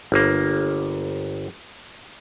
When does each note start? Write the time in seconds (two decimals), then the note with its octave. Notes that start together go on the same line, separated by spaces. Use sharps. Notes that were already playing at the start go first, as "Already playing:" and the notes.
0.12 G1 A#3